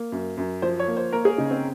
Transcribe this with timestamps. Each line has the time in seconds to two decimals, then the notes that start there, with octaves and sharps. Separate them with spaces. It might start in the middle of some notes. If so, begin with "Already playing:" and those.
Already playing: A#3
0.12 F#2
0.37 F#2
0.62 F3 C5
0.80 C#5
0.88 A#3
0.97 C5
1.13 A#3 A#4
1.25 G#4
1.38 C#3 D#4
1.51 C4